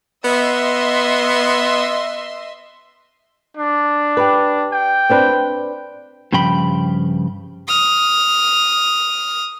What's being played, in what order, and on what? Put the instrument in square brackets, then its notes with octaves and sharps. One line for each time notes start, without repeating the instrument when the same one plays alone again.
[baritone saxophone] B3 [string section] D#5 E5 C6
[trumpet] D4
[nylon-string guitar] G4 B4
[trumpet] G5
[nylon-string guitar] C4 D4 B4
[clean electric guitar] G2 C#3 F3 G5 B5
[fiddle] D#6 F6